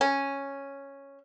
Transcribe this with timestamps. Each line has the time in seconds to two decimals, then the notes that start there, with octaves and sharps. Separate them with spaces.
0.01 C#4